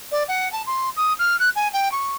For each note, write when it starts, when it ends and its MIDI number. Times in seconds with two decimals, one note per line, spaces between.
0.11 0.23 74
0.28 0.50 78
0.52 0.62 81
0.66 0.89 84
0.96 1.13 87
1.18 1.36 89
1.39 1.49 90
1.55 1.67 80
1.73 1.91 79
1.91 2.16 85